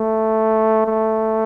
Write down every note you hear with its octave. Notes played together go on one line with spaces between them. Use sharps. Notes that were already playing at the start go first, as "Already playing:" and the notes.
Already playing: A3
A3